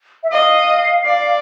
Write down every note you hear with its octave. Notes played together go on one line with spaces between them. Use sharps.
E5
D#5 F5
D5